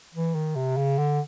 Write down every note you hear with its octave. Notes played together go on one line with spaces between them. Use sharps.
E3
D#3
C3
C#3
D3